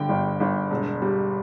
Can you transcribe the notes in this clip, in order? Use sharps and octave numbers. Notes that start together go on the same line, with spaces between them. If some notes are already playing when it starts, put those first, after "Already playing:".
Already playing: G2 D3 G5
G1
G1
E1
G3